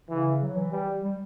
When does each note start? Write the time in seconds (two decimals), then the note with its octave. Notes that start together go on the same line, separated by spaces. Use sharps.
0.09 C#3 E3
0.42 F#3
0.56 E3
0.73 G3
1.03 G3